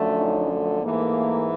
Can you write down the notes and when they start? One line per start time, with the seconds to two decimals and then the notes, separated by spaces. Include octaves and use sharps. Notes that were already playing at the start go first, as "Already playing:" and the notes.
Already playing: F#2 D3 F3 A3
0.16 C#4 D#4
0.50 A3
0.82 G#2 E3 A3 A#3